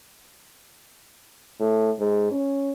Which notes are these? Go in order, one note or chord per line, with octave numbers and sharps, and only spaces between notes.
A2
G#2
C#4